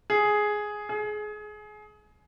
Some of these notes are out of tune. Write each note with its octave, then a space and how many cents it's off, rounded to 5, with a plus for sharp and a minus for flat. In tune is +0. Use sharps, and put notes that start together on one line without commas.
G#4 +5
G#4 +25